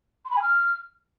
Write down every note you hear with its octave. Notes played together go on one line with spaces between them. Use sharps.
C6
B5
G#5
F6